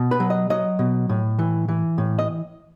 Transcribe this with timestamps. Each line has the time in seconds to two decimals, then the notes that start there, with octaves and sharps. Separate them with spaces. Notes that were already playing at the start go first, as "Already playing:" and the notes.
Already playing: B2
0.11 B4
0.20 F#3
0.30 D#5
0.50 F#3 D#5
0.79 B2
1.09 A2
1.39 E3
1.68 E3
1.98 A2
2.19 D#5